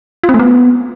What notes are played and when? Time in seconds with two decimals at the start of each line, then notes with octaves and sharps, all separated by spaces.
0.24 F4
0.29 C4
0.34 A3
0.39 B3